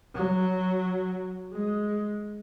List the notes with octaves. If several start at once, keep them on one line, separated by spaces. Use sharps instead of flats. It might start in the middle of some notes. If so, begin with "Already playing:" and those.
F#3
G#3